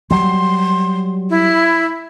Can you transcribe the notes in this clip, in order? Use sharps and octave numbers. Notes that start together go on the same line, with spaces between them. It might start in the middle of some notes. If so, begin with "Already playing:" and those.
F#3 G3 C6
E4